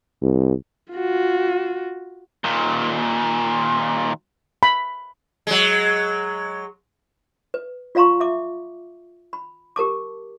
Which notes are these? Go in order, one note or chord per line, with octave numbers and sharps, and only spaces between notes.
C2
F4 F#4
D#2 A#2
B5
F#3 G#3
B4
F4 D5 F5 A#5 C6 C#6
E5 D6
B5
G4 A#4 A5 D6